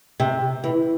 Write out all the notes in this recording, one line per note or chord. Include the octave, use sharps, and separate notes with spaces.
C3
E3